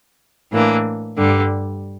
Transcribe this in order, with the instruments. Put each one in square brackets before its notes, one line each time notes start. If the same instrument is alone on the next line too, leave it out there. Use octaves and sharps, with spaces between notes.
[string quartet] A2 E3 A#3 D4
G2 D3 G3